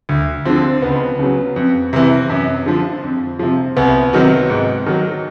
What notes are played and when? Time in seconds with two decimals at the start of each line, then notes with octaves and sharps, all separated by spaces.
0.09 D2
0.45 D3 F3 C4
0.82 C#2 B3
1.19 C#3 F#3
1.56 F2
1.93 C3 E3
2.29 F#2
2.66 D3 F3
3.03 F2
3.39 C3 F3
3.77 C2 B3
4.13 C3 D#3 F#3
4.50 G#2
4.86 D#3 F#3